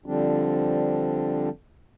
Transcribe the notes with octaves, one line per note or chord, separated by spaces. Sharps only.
D3 F3 G3 C4 D4